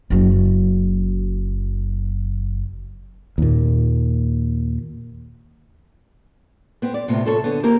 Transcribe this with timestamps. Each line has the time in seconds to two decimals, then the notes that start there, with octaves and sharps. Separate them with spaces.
0.10 F#1 F#3
3.38 D#2 A#2
6.82 B3 C4
6.94 D5
7.08 A2 C3 B3 F4
7.25 F4 A4 A#4 C#5
7.44 D3 B3
7.63 A#3 C4 G4 A#4